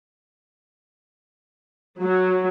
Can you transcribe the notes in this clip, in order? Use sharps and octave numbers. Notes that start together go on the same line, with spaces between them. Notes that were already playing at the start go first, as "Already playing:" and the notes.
F#3